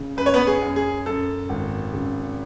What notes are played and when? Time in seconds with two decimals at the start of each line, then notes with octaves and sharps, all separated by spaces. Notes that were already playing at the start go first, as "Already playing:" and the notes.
Already playing: C#3
0.17 F#2 B4
0.26 C#5
0.34 B3 B4
0.47 G#4
0.62 F#2
0.76 G#4
1.06 F#2 A4
1.49 G#1
1.93 C#3